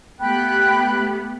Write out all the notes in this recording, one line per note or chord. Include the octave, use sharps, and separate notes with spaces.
A3 B3 G4 G5 B5 F#6